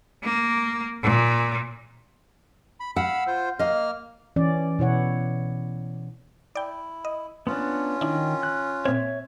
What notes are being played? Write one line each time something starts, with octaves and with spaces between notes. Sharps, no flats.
A#3
A#2
B5
F5 F#5 B5 E6
F4 C5
A#3 D#5 F5 F6
E3 C#4 D5
B2 E4 C#5 F#5
E4 D5 G5
D#5
B3 C#4 D4 F4
D#3 D4 E4
F#6
A#2 C4 C#5 E5